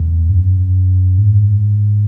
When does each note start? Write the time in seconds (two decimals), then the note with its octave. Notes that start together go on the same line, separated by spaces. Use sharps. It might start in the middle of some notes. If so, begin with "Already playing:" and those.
Already playing: E2
0.29 G2
0.34 F#2
1.18 G#2